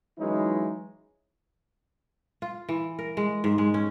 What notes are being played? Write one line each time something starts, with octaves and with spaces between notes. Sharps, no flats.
E3 F#3 G#3 C#4 D#4 E4
F4
E3
A#4
G#3
G#2
G#3
C#4